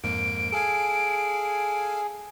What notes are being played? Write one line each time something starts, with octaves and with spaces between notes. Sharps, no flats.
F2 G#2 A#3 D7
G#4 A4 F5 G#5